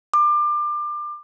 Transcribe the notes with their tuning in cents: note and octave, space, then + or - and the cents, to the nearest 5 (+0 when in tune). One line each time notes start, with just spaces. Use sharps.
D6 +30